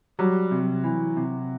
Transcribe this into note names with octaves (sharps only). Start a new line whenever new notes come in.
F#3 G3
C3
E3
C3